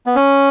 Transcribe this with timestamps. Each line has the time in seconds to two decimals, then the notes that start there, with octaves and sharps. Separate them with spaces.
0.06 B3
0.16 C#4